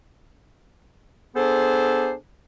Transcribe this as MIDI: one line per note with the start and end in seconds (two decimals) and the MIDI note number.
1.35 2.13 59
1.35 2.13 62
1.35 2.13 68
1.35 2.13 69
1.35 2.13 72